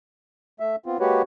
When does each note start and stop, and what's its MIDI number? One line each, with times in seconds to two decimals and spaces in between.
0.60 0.76 57
0.60 0.76 76
0.86 0.98 59
0.86 0.98 60
0.86 0.98 65
1.00 1.22 56
1.00 1.22 58
1.00 1.22 66
1.00 1.22 67
1.00 1.22 71
1.00 1.22 73